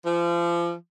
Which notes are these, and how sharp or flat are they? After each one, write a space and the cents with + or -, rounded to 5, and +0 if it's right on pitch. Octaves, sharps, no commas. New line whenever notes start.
F3 -30